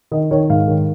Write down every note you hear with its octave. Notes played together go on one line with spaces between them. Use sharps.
D#3 D#5
D#3 C#5
G#2 F5
D#3